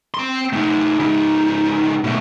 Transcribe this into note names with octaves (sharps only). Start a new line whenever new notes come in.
C4 C6
A3 D#4
C#2 D#4
B2 A3